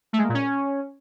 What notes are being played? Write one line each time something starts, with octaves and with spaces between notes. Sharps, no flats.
A3
G#3
A#3
A#2
C#4